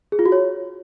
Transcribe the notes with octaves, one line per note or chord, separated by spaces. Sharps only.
G#4
F4
F#4
C#5